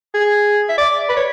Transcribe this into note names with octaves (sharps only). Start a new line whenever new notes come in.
G#4
E5
D5
B4
C#5